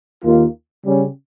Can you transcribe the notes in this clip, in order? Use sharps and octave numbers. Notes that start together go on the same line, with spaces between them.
D#2 D#3 A#3 F4
C#3 G3 C#4